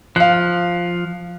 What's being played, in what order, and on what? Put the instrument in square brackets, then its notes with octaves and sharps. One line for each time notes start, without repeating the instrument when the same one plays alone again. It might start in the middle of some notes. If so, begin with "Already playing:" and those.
[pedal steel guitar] F3 [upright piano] F5 F#6